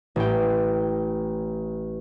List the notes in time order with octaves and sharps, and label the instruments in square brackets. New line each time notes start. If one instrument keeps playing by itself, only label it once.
[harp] A1 G5